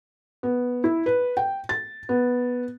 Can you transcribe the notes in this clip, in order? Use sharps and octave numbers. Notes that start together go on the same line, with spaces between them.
B3
E4
B4
G5
A6
B3